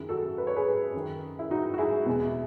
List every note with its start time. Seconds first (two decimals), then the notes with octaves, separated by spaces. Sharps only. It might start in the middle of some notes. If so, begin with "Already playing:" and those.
Already playing: F#2 D#3 E4 G#4
0.09 F#4 A4
0.38 B4
0.47 C#5
0.56 G#4 B4
0.93 F#2 D#3
1.39 E4
1.51 D#4 F#4
1.74 F#4
1.78 E4 G#4
2.06 E2 B2